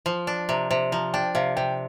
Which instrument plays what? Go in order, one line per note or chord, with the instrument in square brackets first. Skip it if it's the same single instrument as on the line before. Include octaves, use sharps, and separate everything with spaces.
[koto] F3 [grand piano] C6
[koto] D4
[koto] C3 [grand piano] A#5
[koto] C3
[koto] F3 [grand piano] A#5
[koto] D4 [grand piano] G5
[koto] C3 [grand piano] F5
[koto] C3 [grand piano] G5